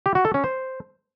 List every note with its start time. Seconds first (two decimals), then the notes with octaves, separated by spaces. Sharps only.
0.06 G4
0.15 F#4
0.25 A4
0.34 C#4
0.44 C5